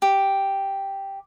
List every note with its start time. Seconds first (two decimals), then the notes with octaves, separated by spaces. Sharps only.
0.02 G4